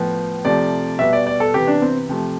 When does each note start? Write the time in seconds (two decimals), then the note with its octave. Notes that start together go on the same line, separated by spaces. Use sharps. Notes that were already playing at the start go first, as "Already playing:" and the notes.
Already playing: A2 F3 B3
0.45 C3 F3 A3 D5
0.99 B2 G3 B3 E5
1.13 D5
1.27 D5
1.40 A4
1.54 C3 E3 B3 G4
1.67 D4
1.82 C4
2.09 C3 F3 A3